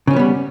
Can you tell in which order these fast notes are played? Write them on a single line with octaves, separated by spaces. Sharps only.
C#3 C#4 F3 B3 G3